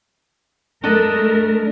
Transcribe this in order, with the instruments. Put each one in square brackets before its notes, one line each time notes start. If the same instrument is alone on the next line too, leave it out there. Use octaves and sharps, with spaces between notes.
[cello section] G#3 A3 A#4 [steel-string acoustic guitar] D4 A4 D#5